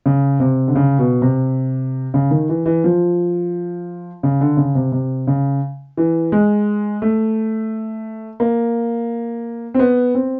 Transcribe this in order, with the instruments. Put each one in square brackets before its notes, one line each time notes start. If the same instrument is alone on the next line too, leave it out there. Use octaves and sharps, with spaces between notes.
[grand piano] C#3
C3
D3
C#3
B2
C3
C#3
D#3
E3
E3
F3
C#3
D3
C#3
C3
C3
C#3
E3
G#3
A3
A#3
C4
B3
C4